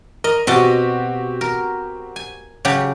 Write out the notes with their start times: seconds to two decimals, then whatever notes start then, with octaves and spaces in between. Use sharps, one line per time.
0.24 A#4 D#5
0.47 B2 C4 F#4 G4 D#5 A5
1.41 A#4
2.16 G#5
2.65 C#3 F#3 G4